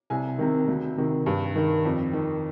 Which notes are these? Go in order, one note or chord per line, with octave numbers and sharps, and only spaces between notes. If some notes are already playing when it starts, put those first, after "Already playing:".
C2 G#5
C3 D#3
D2
C3 D#3
G2
D#3
F2
D#3